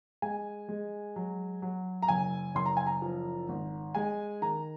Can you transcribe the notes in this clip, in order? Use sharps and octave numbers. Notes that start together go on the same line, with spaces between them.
G#3 G#5
G#3
F#3
F#3
A#5
F#1 G#5
F#1 C6
A#5
G#5
A#5
F3
G#1
G#3 G#5
D#3 A#5